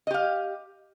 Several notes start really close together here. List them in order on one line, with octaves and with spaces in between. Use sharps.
D#5 G4 F5